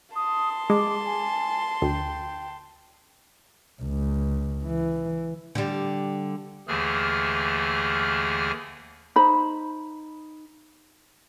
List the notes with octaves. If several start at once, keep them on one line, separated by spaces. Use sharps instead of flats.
A5 C6 D#6
G#3 D6
G#5
D2 G5
C#2
E3
D3 G3
D#2 D3 E3 A3 G#4 F6
D#4 C5 B5